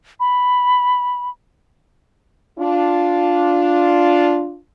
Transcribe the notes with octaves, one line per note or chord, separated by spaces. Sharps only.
B5
D4 F4